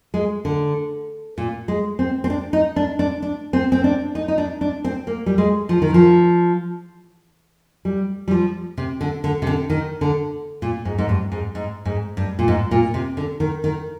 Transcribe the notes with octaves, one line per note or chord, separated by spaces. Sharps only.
G#3
D3
A#2
G#3
C4
C4
D4
D#4
D4
D4
D4
C4
C4
D4
D#4
D#4
D4
D4
C4
A#3
G3
G#3
F3
D#3
F3
G3
G3
F3
C3
D3
D3
C3
D3
D#3
D3
A#2
G#2
G#2
G2
G#2
G#2
G#2
G2
A#2
G#2
A#2
C3
D3
D#3
D#3